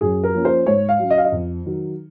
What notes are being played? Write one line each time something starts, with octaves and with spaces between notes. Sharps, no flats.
F#2 G#4
A#4
F3 A#3 C#4
C5
G#2 C#5
F5
F#3 C#4
D#5
F5
D#5
F2
D#3 F#3